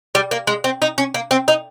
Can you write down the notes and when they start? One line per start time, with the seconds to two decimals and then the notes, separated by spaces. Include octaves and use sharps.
0.15 G3
0.31 A#3
0.47 G#3
0.64 C4
0.82 D#4
0.98 C#4
1.14 A#3
1.31 C4
1.48 D#4